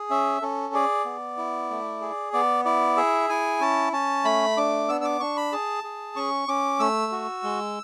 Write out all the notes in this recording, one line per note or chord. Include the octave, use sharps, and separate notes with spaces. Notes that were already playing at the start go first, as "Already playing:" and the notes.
Already playing: G#4
C#4 E5
C#4 A4
G#4 D5
B3
E4
A3
G#4
B3 D5
E4 D5
G#4 E5
E4 G#5
C#4 A5
C#4 A5
A3 B5
D4 D6
B3 E6
E6
D6
D4 C#6
B5
G#4 A5
G#4
C#4 C#6
C#4 D6
A3 E6
F#4
G#3